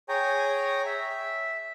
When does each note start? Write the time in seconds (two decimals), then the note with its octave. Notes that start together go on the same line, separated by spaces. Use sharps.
0.09 G#4 C#5 G5 G#5 A#5
0.86 E5